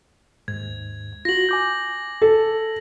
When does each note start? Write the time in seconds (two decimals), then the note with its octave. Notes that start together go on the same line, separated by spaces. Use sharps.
0.48 D#2 G#2 G#6
1.25 F4 F#4 A#6 F#7
1.49 G#5 D6 G6
2.22 A4